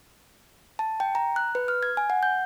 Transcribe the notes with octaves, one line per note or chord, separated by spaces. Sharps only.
A5
G5
A#5
F#6
B4
F6
G#6
G#5
F#5
G6